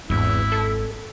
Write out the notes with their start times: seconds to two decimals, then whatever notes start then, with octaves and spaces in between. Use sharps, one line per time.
0.10 G#1 E2 E4
0.52 A4